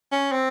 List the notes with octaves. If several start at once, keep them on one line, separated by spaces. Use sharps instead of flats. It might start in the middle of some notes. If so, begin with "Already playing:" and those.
C#4
C4